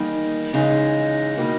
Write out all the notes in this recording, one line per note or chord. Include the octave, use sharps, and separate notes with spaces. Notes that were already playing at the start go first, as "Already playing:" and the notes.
Already playing: E2 D#3 G3 A#3 D#4
C#3 E3 G#3 D#4
B2 G3 A#3 D#4